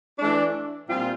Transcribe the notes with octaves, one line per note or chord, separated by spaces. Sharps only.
E3 A3 D4
A#2 G3 C4 F4